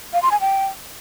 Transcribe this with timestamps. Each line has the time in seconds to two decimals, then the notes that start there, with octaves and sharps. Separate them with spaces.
0.13 F5
0.22 C6
0.31 G#5
0.41 G5